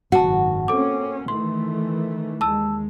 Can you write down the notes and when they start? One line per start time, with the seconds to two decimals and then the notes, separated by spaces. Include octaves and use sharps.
0.12 F#1 G#2 D#3 F#4 F#5 A5
0.68 A#3 C4 C#4 A4 D6
1.28 D#3 E3 A3 C6
2.41 D#2 G#3 A5 E6